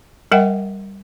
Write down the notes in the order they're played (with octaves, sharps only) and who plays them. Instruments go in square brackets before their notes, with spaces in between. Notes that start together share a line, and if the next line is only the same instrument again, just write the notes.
[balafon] G3 A#4 E5 F#5 G5